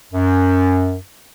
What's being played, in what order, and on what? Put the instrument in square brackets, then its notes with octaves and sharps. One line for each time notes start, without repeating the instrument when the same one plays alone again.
[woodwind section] F#2